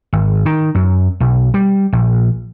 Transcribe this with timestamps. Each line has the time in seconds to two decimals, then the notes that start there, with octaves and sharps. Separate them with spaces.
0.13 G#1
0.46 D#3
0.75 F#2
1.20 B1
1.54 G3
1.93 A#1